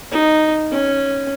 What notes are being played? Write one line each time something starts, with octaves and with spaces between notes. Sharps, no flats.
D#4
C#4